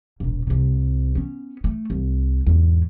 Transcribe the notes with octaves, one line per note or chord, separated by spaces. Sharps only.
E1 A#1
C2 C3
B3 C#4
A3
C2
E2 G#2